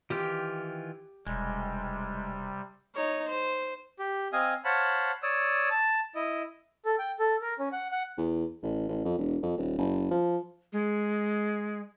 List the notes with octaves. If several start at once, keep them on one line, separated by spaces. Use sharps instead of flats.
D#3 E3 F4 G4
E1 C3 G3 G#3
D#4 C#5
C5
G4
C4 D#5 F5 G#5 D#6
C5 C#5 F5 F#5 A5 B5
C#5 D5 D#6 E6
A5
E4 D#5
A4
G5
A4
A#4
C#4
F#5
F#5
E2
A1
A1
F2
E1
F2
D#1
F#1
F3
G#3